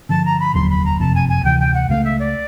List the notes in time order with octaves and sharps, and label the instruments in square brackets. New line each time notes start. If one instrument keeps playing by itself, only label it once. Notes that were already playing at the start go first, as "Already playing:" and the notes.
[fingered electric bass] G2 D3 F3 [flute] A5
[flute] A#5
B5
[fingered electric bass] F1 D#2 D3 F#3 [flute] C6
[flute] B5
A#5
[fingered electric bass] F#1 F2 C3 [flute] A5
[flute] G#5
G#5
[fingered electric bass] D2 C3 E3 [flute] G5
[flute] G5
F#5
[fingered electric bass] C#2 C#3 F#3 A3 [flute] F5
[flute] E5
D5